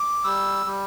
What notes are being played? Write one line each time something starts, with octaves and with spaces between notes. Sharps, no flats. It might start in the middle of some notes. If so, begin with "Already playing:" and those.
Already playing: D6
G3 E6
G3